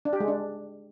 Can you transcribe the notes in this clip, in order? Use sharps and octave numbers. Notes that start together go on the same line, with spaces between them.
D4
G4
G#3
D4